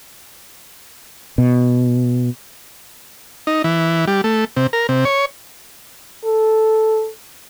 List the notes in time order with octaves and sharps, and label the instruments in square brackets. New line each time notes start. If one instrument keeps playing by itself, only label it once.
[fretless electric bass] B2
[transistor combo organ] D#4
E3
G3
A3
C3
A#4
C3
C#5
[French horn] A4